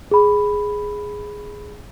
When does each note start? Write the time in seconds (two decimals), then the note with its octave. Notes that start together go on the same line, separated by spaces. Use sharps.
0.11 G#4 B5